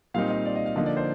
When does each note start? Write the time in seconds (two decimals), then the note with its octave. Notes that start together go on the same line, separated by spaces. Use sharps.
0.14 A#2 G3 C4 D#4 F5
0.30 D#5
0.46 D5
0.55 D#5
0.66 F5
0.76 D3 F3 A#3 D#4 D#5
0.86 D5
0.97 C5